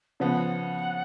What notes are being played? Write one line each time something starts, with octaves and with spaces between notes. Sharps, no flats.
C#3 F3 B3 F#5